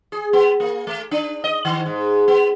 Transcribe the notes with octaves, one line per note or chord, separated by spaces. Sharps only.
G#4
B3
A#3
A3
D4
D#5
D#3
G#2
B3